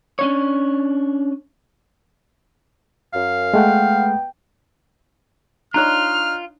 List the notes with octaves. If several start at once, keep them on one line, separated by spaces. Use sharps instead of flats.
C#4 D4 C#5
F#2 F5
G#3 A3 B3 F#5 G5
D4 D#4 F4 C#5 A#5 F6 F#6 F7